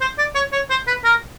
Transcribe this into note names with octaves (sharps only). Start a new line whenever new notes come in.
C5
D5
C#5
C#5
C5
B4
A#4